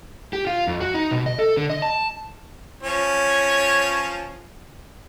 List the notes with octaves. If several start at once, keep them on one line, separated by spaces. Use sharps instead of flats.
G4
F4
F2
F#4
D#4
B2
D#5
A4
D3
D#5
A5
F3 C#4 C#5